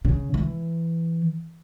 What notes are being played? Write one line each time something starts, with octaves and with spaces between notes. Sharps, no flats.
C#3
E3